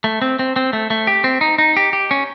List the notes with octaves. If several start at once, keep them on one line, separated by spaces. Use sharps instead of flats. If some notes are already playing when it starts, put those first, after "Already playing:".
A3
C4
C4
C4
A3
A3
G4
C4
D#4
D#4
G4
G4
C#4